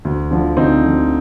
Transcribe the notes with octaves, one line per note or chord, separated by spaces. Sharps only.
D2
D3 F3
D2 C4 D#4
D3 F3